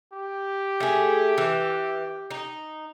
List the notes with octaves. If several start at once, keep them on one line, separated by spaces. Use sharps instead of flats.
G4
A3 G#4
E3
D#4